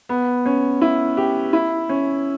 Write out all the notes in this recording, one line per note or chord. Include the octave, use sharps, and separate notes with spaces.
B3
C#4
E4
G4
E4
C#4